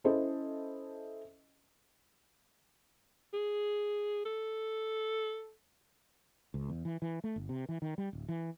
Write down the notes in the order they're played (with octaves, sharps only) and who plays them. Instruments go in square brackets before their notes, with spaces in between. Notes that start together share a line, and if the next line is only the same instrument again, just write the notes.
[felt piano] C#4 E4 A4 C5 D#5
[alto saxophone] G#4
A4
[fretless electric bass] C#2
E2
E3
E3
A3
G1
C3
E3
D#3
G3
D1
E3